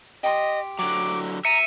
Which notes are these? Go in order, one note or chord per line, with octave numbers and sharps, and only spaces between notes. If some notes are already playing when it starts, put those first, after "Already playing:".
G4 D#5 C6
D3 F#3 D6
E5 A#5 C#7 D#7